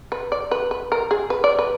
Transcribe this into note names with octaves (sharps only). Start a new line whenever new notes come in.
B4
D5
B4
B4
A#4
G#4
B4
D5
B4